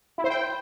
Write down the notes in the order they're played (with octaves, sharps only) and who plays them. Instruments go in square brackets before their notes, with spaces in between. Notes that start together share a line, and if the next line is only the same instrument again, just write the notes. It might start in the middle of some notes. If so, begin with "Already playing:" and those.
[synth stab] E4
C5
G5